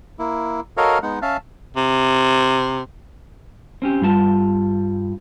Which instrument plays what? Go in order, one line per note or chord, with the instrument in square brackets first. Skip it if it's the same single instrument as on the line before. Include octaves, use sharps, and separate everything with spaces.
[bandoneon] A#3 E4
F#4 A4 A#4 C#5 D#5 F5
G#3 B3 D#4 F#5
C#4 E5 F5 A5
[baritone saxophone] C3
[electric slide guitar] C4 C#4 G4
G2 G3 F4 A5